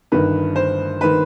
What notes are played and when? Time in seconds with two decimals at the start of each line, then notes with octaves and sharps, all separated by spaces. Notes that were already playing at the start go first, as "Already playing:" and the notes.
0.12 G1 G2 D#3 B4
0.56 C5
1.01 D#3 B4